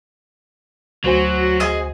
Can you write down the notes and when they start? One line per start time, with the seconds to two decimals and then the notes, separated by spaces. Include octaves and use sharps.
1.04 D2 F#3 F#4 C5 G#5
1.60 G#4 D#5